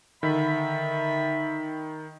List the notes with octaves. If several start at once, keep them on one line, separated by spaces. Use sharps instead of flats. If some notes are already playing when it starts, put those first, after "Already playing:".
D3 D#3 E5 B5